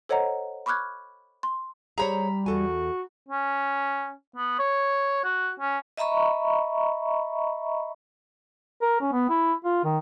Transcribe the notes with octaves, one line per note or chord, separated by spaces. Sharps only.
A4 C5 C#5 D#5 F#5 A#5
B5 C#6 D6 F6 F#6 G#6
C6
G3 G#4 C5 C#5 A#5 B5
E2 F#4 A4 G#5
C#4
B3
C#5
F#4
C#4
D#5 E5 A#5 B5 C#6
A#4
C#4
B3
E4
F4
D#3